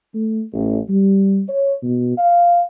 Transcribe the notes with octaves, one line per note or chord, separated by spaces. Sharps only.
A3
A1
G3
C#5
B2
F5